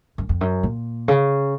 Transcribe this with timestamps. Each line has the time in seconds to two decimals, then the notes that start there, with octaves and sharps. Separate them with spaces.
0.18 F#2
0.29 F2
0.41 F#2
0.63 A#2
1.08 C#3